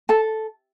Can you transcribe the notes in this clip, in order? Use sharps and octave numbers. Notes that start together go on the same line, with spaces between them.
A4 A5